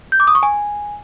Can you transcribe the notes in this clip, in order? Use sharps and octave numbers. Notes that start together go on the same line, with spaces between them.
G6
D6
D#6
C#6
G#5